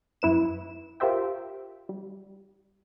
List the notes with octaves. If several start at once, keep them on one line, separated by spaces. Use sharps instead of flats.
F#2 E4 B4 E7
F4 G4 A#4 C5 E5 G5
G3